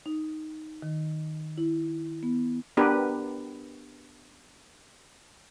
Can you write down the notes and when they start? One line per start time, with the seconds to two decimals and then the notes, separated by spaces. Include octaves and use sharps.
0.06 D#4
0.82 D#3
1.58 E4
2.23 B3
2.77 B3 D4 G4 A#4 B4